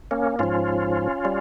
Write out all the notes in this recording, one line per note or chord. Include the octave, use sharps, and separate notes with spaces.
A#3 C#4
G#2 F3 C#4 F4
G3